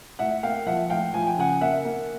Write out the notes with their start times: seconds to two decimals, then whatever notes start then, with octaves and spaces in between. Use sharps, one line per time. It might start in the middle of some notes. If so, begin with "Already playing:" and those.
0.19 A2 E5 F#5
0.43 A#3 F5 G5
0.66 F3 E5 F#5
0.90 A2 F5 G5
1.14 F3 G#5
1.27 G5
1.38 C#3 F#5 G#5
1.61 A#3 E5 F#5
1.85 A#3